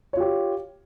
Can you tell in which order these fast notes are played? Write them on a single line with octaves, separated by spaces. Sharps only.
C#5 F4 G4